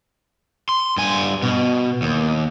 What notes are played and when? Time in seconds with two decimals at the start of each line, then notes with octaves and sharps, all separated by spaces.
0.69 C6
0.97 G2 G#5
1.42 B2
2.02 D#2